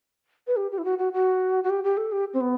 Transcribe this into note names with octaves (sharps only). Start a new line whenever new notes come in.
B4
G4
G4
E4
F#4
F#4
F#4
F#4
G4
G4
A4
G4
C4
B3